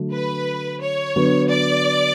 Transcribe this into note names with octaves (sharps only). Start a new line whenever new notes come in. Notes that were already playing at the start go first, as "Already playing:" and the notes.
Already playing: D3 F#3 A3 D4
B4
C#5
D3 F#3 B3
D5